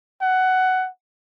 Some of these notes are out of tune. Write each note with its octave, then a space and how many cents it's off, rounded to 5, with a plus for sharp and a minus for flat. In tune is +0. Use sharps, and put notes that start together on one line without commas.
F#5 +10